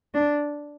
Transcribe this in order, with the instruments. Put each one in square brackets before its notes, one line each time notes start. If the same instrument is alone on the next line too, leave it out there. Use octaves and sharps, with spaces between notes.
[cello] D4